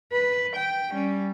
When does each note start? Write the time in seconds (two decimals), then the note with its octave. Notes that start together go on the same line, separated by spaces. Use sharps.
0.12 B4
0.56 G5
0.90 G3 C#4